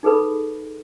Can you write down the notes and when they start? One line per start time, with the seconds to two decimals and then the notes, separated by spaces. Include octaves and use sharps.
0.03 D#4 G#4 A4 B4 B5